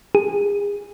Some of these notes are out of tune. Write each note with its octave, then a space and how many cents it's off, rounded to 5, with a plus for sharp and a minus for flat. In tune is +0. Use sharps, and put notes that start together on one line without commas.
G#4 -35